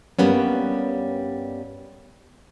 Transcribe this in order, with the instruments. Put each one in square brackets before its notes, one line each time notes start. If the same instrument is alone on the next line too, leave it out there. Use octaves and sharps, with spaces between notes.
[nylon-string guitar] G2 G3 A#3 B3 C#4